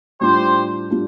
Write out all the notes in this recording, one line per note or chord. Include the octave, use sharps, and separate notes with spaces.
A2 G3 D4 F4 G4 C5
A2 G3 D4 F4